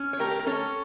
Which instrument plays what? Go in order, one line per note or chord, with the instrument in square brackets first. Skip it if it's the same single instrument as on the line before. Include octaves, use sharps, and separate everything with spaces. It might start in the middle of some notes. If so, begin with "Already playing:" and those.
Already playing: [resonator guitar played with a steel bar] C#4
C#5
A3 G4 A#4
A#4
C#4 A4 C#5